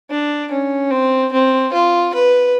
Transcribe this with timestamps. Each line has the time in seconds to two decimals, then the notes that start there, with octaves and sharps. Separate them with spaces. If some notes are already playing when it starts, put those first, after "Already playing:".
0.10 D4
0.51 C#4
0.91 C4
1.33 C4
1.73 F4
2.14 B4